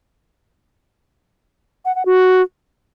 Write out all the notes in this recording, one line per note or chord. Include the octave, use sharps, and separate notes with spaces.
F#5
F#5
F#4